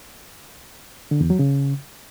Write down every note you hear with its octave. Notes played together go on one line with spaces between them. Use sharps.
D3
E2
F#3
C#3